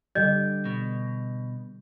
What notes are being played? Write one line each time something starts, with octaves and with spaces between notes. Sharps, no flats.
D3 G3 G4 D#5 G6
B2